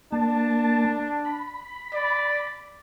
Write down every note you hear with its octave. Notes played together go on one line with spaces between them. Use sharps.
A#3 D4 A5
B5
D5